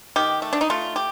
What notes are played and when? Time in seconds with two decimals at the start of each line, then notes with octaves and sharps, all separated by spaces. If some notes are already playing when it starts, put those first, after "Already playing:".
0.16 D#3 G4
0.42 A3
0.53 D4
0.61 D#4
0.70 A3 F4
0.96 G4